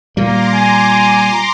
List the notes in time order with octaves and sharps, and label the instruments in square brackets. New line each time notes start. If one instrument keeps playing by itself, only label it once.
[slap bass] A#2 G3 [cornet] A#3 [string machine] A#5 C6 D6
[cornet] G#5